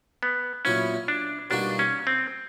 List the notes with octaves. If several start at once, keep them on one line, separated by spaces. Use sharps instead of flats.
B3
A#2 F#3 B3 C#4 E4
D4
B2 G3 A#3 D4 D#4 F#4
C#4
C4